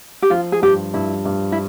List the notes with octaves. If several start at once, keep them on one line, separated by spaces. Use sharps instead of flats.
G4
F3 F4
G#4
G2 G4
G2 E4
G2
E4